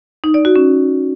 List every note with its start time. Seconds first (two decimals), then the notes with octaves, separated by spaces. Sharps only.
0.24 D#4
0.34 D5
0.45 F#4
0.56 C#4